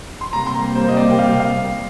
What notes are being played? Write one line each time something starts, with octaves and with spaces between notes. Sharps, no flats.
C6
C3 G3 A#3 A#5
C6
A#5
C5
D#5
D5
G5
F5
F5